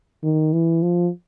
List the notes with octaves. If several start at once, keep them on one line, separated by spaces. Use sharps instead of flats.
D#3
E3
F3